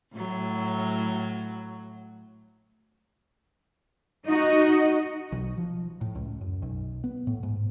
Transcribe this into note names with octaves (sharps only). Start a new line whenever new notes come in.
A2 F#3
D#4 F#4 D#5
B1
F3
A2
C#2
F#2
B1
B3
A2
G#2